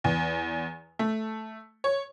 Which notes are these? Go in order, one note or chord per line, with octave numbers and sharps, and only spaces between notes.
E2
A3
C#5